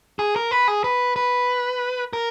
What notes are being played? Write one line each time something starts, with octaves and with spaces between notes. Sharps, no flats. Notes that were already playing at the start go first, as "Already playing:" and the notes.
G#4
A#4
B4
G#4
B4
B4
A#4